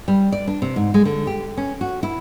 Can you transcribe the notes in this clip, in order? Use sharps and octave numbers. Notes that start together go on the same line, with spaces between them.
G3
D5
D4
C3
G#2
G#3
D3
G4
C#4
F#4
E4